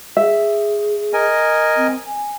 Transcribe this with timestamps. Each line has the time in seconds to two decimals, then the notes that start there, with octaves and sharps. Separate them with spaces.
0.17 G#4 E5
1.13 A#4 D#5 G#5
1.76 C4
2.06 G#5